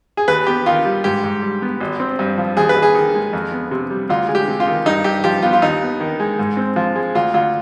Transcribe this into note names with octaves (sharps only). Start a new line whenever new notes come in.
G#4
D#2 B4
B3 G4
D#3 F4
G3
G#2 G4
G#2
G3
B3
G#1
C4
G2
F3
D#2 G#4
B4
D#2
G#4
D#3
G#3
F2
B3
C3
G3
D2 F4
G#3
G4
C3
F4
D#3
G2 D#4
G2 G4
F3 G4
B3 F4
F4
D#2 D#4
B3
D#3
G#3
G#2
C4
F3
G#3
D2 F4
D2 F4